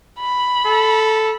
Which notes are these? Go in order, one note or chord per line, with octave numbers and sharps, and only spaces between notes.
B5
A4